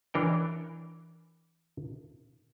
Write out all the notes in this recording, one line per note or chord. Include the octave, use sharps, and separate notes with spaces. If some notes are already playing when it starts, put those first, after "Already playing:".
E3 D4 A#4 C#5 G5